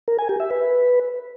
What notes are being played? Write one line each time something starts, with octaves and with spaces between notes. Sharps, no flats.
A#4
G#5
G4
E5
B4